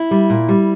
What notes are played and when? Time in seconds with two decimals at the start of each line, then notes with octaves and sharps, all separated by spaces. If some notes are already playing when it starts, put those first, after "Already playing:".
Already playing: E4
0.11 G3
0.30 A#2
0.49 G3